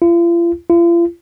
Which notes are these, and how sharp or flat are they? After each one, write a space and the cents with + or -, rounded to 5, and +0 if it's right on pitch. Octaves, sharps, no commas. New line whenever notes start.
F4 -45
F4 -45